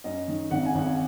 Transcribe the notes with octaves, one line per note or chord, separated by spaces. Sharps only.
F#2 D#5
D#3
G#1 F#5
G#5
G#1 F#5